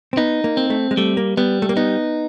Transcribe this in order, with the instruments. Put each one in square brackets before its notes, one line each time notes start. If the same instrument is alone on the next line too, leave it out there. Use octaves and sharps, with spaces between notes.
[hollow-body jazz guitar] C4
[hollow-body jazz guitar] B3 [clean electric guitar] D#4
[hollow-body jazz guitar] A#3
[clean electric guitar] C4
[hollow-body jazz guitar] A3
G#3
[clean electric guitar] G3 [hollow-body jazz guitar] A3
[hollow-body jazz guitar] A#3
[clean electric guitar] G3 [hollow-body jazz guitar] B3
[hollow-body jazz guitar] A3
A#3
[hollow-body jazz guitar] B3 [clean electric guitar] D#4